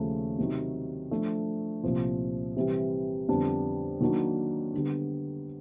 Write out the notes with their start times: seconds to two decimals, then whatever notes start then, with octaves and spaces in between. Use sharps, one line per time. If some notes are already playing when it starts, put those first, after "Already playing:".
Already playing: D#2 C#3 F3 A3 C#4
0.38 C3 D#3 F#3
1.11 F3 A3 D4
1.83 C2 A#2 F3
2.57 C3 E3 G3
3.28 F2 D3 G3 B3 D4
4.01 D#3 F#3 A#3 D4 F#4
4.74 D3 G3 B3